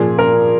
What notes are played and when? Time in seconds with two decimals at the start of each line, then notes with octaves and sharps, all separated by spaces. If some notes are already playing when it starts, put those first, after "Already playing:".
Already playing: A#2 F3 G#4
0.19 A#4